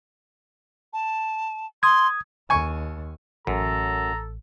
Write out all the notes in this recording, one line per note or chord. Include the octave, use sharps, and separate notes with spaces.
A5
C6 D#6 G#6
D#2 G#5 C#6
A1 F#2 A4 A#5